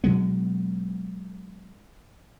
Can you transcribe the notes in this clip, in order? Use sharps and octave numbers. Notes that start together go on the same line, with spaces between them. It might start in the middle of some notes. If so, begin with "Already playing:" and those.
B2 F#3 G#3 B3